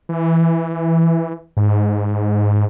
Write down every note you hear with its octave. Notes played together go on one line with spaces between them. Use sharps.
E3
G#2